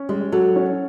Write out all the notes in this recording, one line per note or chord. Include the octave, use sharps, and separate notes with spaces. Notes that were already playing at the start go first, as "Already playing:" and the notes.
Already playing: C#4
G3 G#3
F#3 A4
C#4